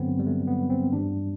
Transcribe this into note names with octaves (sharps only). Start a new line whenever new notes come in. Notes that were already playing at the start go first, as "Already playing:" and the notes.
Already playing: G2 D3 F#3 B3 C4
G3
A3
B3
C4
G2 E3 G3 D4